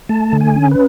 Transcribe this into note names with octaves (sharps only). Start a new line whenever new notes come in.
A3 A5
D3
G#5
C#4
B4